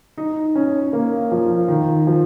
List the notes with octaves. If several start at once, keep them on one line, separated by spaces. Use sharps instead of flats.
D#4
C#4
A#3
F3
D#3
F3